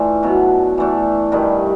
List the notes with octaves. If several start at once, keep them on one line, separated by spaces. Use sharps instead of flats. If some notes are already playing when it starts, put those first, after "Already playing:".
Already playing: E3 A3 D4 F4
B2 F#3 B3
E3 A3 D4
G2 D#3 G3